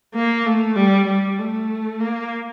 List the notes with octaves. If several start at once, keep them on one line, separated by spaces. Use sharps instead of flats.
A#3
A3
G3
G3
A3
A#3